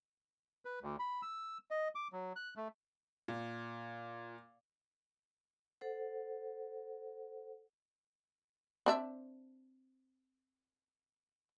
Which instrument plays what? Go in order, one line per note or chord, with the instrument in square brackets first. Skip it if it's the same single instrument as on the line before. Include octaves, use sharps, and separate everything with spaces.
[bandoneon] B4
D2
B5
E6
D#5
D6
F#3
F#6
A3
[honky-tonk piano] A#2
[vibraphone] A4 C5 F#5
[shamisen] C4 D4 E5